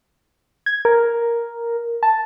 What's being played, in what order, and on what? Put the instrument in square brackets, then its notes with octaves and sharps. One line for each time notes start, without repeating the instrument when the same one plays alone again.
[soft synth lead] G#6
A#4
A5